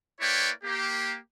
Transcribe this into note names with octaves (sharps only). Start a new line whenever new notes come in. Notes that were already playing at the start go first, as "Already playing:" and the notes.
A#3 E4 B4 C#5 D5 G5
A#3 G4